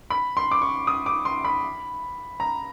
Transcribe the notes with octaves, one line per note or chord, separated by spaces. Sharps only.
B5
C6
D6
C#6
D#6
D6
C6
B5
A#5